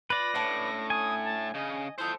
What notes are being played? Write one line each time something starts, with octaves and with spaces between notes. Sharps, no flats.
F4 B4 D5 B5 A#6
A2 C#4 D4 F#5
G#5 D#6
A5
C#3 D#5
E4 F4 A4 C5 D#5 G6